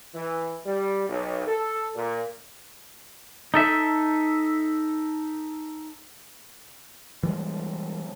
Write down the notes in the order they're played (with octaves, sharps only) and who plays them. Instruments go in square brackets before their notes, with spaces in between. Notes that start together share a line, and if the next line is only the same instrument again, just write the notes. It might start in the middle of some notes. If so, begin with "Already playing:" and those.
[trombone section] E3
G3
B1
A4
A#2
[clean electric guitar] D#4 A4 E5
[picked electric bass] E3 G3 G#3